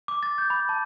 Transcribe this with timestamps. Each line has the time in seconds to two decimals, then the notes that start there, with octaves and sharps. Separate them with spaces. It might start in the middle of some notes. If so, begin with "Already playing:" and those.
0.08 D6
0.23 A6
0.38 G6
0.50 B5
0.69 A5